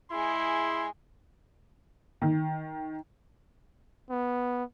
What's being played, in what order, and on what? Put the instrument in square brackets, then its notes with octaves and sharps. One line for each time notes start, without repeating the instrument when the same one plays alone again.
[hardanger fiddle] G#3 G#4 [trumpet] E4 [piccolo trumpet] C6
[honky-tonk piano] D#3
[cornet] B3